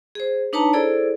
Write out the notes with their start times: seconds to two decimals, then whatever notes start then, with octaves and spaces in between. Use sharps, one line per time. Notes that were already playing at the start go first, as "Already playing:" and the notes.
0.15 G#4 C5
0.53 D4 D#4 B4 C#5 A5 A#5
0.73 E4 G#4 A4 C5 D5